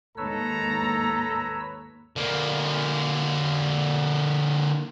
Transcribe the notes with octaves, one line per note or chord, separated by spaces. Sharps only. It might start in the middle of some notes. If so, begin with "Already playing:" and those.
D#2 G#2 A4 B4 C#5 A#5 E6
D3 A#3